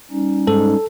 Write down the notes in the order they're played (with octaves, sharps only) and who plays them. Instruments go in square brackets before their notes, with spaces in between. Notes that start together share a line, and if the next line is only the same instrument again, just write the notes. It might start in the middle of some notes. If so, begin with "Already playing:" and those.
[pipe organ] G3 C#4 D#4
[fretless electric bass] G#2 [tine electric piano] A4